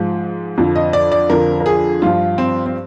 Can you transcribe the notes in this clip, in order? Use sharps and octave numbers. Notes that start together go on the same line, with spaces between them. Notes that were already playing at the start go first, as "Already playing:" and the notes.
Already playing: G#2 F3
F2 D3 F3
D#5
D5
D5
F2 D3 F3 A#4
A#4
G#4
G2 F3 F4
C4
C4